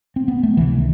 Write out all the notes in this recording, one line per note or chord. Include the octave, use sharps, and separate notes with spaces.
C4
B3
A3
C#2 C3 E3
D#3